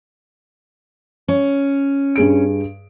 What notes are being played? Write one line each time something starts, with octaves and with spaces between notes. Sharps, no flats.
C#4
G2 G#4 D7